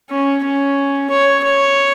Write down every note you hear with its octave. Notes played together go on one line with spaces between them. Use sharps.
C#4
C#4
C#5
C#5